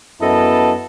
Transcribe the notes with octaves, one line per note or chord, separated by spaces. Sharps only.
F#2 B3 E4 A4 D#5 A5